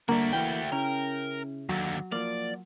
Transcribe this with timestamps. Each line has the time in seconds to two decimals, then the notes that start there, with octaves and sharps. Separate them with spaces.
0.09 D3 G3 A3 A#3 F#4 A#4
0.33 E3 A#3 G5
0.72 C#3 C#4 E4 A#4
1.69 D#2 D3 F#3
2.12 F3 A#3 D5